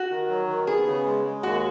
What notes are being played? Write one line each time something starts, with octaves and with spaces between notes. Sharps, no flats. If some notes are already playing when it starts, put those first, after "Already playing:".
Already playing: F#4
D#3
F#3
D#3
B3 G#4
C#3
G#3
G#3
D#2 F#4